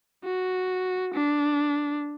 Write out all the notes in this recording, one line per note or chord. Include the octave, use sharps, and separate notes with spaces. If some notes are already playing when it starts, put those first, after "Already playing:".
F#4
D4